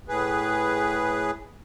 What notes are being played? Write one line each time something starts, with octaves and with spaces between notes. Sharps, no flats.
A2 G#4 B4